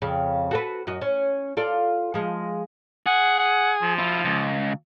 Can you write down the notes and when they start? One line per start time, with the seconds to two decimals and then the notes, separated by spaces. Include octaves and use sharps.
0.02 F2 C#3
0.51 F#4 A4 B4
0.87 F#2 F#4 D#5
1.01 C#4
1.57 F4 A4 D5
2.14 F3 G#3
3.06 G#4 F#5
3.39 F#5
3.82 F3
3.99 E4 F4
4.25 C#2